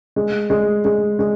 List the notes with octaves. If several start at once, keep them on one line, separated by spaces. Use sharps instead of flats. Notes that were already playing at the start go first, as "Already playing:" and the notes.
G#3
G#3
G#3
G#3